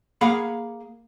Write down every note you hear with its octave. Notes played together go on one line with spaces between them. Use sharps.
A#3 G#4 F5 F#5 B5